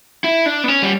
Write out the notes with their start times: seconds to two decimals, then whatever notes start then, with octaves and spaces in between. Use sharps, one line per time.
0.24 E4
0.46 D4
0.64 B3
0.68 C#4
0.82 G3